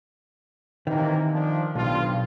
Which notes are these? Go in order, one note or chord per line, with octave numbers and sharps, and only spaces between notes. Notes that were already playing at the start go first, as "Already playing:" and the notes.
C3 D#3 E3 A#3
F3 D4
B1 G2 F4